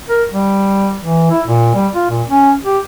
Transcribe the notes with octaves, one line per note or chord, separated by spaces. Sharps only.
A#4
G3
E3
E4
A#2
G3
F4
A#2
C#4
G4